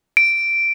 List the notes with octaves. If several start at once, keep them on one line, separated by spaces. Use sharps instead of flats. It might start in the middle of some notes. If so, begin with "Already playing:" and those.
D7